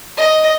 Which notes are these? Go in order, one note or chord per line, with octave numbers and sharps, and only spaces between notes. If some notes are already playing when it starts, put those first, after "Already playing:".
D#5